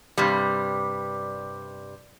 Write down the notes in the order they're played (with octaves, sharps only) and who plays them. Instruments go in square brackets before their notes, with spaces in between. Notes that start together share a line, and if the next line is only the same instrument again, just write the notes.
[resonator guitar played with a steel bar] G2 C3 G3